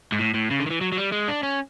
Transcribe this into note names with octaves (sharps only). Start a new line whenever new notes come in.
G#2
A2
A2
C#3
D3
D#3
E3
F#3
F#3
G3
G#3
D4
C#4